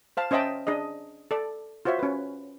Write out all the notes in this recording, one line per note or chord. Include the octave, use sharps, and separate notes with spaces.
C5 F5 A5
C#4 C5 D#5 E5 G5 A5
D4 G#4 D#5
A4 D5
F4 F#4 C5 C#5 E5
C#4 B4